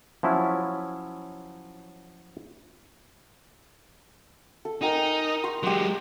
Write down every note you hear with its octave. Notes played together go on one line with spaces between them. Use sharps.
F3 F#3 C#4 E4
A4
D#4 A#4 G5 G#5
C6 C#6 D#6
F#3 G#3 G4 C#6